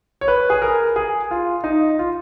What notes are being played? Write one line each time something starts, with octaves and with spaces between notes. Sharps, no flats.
C#5
B4
G#4
A#4
G#4
F4
D#4
F4